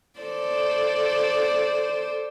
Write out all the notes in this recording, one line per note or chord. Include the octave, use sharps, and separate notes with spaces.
A4 C5 D5